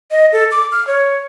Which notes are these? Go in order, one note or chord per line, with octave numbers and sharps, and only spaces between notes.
D#5
A4
D6
F6
C#5